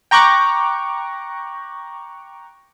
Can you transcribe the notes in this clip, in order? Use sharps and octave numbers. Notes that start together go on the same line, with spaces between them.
G5 A#5 C#6 D6 F#6